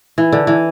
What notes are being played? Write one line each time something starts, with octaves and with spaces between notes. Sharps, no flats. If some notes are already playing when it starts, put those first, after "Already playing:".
E3
D3
E3